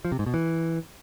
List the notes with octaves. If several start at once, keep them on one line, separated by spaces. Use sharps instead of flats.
F3
C3
G#2
B2
E3